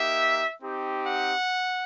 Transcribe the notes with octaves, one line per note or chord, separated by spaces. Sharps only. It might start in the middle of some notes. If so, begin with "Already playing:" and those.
Already playing: A#3 D#4 G4 E5
C4 D#4 G4
F#5